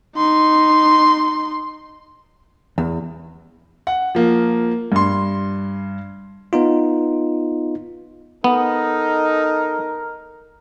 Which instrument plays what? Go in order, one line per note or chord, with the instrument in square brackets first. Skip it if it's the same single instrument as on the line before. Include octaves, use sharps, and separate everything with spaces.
[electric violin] D#4 C6
[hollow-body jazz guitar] E2
[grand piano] F#5
F3 A#3
G2 C6
[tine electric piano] B3 D#4 F4
[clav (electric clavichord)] B3 [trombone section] D#4 A4 [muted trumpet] A#4